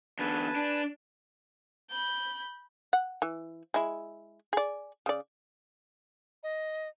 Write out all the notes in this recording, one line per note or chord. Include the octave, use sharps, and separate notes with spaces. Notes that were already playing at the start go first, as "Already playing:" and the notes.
E2 D3 B4 G#5 A5
D4
B5 G6
F#5
E3
G#3 E4
G#4 D5
C#3 D5
D#5